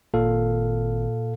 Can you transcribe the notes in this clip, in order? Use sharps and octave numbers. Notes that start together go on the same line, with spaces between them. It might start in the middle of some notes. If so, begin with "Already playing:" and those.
G#1 A#2 A4 F5